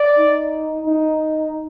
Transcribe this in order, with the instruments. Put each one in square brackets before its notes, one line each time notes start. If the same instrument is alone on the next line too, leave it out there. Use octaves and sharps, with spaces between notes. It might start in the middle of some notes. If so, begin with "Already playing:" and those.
Already playing: [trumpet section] D5
[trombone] D#4
D#4